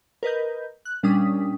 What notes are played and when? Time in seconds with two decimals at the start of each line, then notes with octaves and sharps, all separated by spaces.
0.23 A#4 B4 D#5 G6
0.85 F#6
1.03 A#2 G3 C#4 D4 D#6 B6